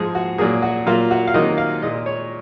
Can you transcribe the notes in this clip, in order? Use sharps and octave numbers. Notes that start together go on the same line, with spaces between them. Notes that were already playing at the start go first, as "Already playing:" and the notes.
Already playing: G#2 F3 G#3 G#4
F#4
A#2 F#3 A#3 G#4
F#4
A#2 F#3 A#3 F4
F#4
F5
C3 D#3 F#3 A#3 D#5
F5
A#2 G#3 D#5
C#5